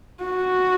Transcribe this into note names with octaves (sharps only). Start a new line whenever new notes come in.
F#4